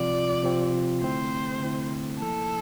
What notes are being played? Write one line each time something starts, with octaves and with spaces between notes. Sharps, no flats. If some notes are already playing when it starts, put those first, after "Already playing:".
Already playing: C3 F3 C4 F4 D5
C3 F3 C4 F4
D3 A3 C4 E4 C5
D3 A3 C4 E4
F3 A#3 E4 A4